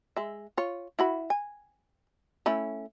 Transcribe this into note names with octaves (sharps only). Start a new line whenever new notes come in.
G#3 E5
F4 C#5
E4 F#4 B5
G#5
A3 C#4 E4